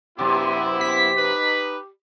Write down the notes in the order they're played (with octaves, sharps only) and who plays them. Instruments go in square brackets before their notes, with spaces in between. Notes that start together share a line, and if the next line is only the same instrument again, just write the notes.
[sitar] F#2 C3 [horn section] B3 E4 [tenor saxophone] G4
[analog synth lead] B6
[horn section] D#4 B4